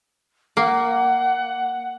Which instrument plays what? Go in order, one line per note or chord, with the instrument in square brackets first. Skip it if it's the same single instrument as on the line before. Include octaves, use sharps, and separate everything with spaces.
[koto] A#3 [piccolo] F#5